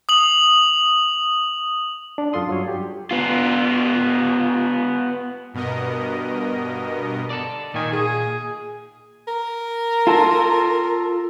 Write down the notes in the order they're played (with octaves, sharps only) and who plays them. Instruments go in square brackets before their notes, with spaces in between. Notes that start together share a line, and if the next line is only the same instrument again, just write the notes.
[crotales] D#6 F#7
[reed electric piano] D4
F#2 F4 A4 C6 D#6
G2 F#3 F4 C#5
G4
[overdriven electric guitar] B3 F4
[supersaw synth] G2 B2 B3 A#4 D#5
[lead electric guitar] A4 D5
[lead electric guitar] A#2 G#5 [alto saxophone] D#3
[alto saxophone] G#4
[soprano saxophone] A#4
[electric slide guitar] F4 A4